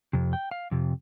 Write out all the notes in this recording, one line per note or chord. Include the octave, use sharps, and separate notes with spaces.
F2 C3
G5
F5
F2 C3